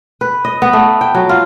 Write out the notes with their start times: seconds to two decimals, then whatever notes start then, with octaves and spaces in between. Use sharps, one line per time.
0.21 B4
0.45 D#5
0.62 B3
0.73 A3
1.01 G5
1.14 F#3
1.29 F4